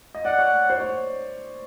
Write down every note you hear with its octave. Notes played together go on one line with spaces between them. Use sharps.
D#5
D5 F#5
C#5
C5
C#5